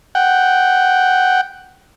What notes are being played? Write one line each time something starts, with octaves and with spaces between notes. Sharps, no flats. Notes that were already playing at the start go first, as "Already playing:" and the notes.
F#5 G5